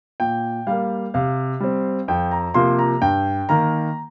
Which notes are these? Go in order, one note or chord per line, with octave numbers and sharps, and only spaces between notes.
A#2 G5
G3 A#3 F5
C3 F5
G3 C4
F2 G5
A#5
C3 F3 A#3 C6
A#5
G2 G5
D#3 A#3 A#5